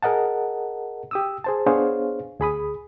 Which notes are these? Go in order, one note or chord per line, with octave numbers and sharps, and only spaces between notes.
G#4 A#4 D#5 F#5 A5
G4 D#6 E6
G#4 C5 A5
B3 D4 G#4 C5 C#5 F5
D2 G#4 B5 D#6